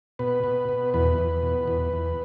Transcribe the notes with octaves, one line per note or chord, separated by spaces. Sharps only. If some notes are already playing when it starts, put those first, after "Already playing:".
B2 B4
B2
B2
E2 B4
E2
B2
E2
E2